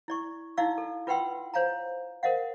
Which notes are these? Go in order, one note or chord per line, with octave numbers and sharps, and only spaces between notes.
E4 D5 C#6
D#4 E4 F#4 D5 F5 E6
A4
F4 B4 F#5 G5 C6 E6
C5 C#5 F5 G#5 A#5
A#4 C5 D#5 F5 F#5